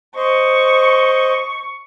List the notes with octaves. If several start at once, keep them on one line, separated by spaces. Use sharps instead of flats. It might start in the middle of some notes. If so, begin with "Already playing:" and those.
C5 D#5 C#6